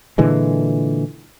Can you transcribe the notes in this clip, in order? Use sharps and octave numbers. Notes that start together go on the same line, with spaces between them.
A#2 D3 E3 G#3